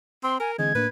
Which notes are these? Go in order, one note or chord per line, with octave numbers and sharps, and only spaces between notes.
C4 C6
A#4 G#5
D3 E3 G#3 C4 G#6
A2 A#3 D4 B4